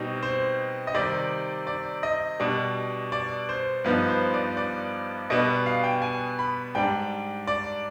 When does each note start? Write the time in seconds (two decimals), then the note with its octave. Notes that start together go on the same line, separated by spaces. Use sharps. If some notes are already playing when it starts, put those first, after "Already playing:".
Already playing: B2 G3 C4 D#4
0.23 C5
0.87 D#5
0.94 C3 D#3 G3 D5
1.67 D5
2.03 D#5
2.40 B2 G3 D4
3.12 D5
3.49 C5
3.84 G2 F3 B3 D#4 B4
4.08 C5
4.34 D5
4.57 D5
5.30 B2 G3 B3 D4 D#5
5.66 F5
5.84 G5
6.02 G#5
6.39 B5
6.75 G#2 G3 D4 G5
7.47 D5